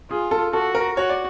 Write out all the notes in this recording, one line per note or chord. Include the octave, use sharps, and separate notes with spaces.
F4 G#4
A4
F#4 A4
A#4
F#4 C#5
D5